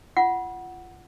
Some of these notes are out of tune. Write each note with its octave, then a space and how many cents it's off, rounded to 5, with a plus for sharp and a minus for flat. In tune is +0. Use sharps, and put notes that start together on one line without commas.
F4 -25 F#5 +0